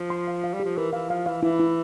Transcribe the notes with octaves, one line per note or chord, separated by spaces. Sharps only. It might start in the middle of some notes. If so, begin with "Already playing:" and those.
Already playing: F3
C6
F5
F5
G3
G4
F3
E3 A#4
E3 F5
F3 F5
E3 F5
E3 E4
E4